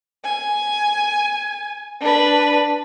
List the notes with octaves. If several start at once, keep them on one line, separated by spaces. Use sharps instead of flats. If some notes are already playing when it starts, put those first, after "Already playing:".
G#5
D4 B4